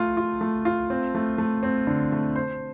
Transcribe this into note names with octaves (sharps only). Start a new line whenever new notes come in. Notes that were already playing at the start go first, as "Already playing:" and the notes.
Already playing: A3 F4
F4
A3
F4
C4
A3
A3
C4
D3
A3
C5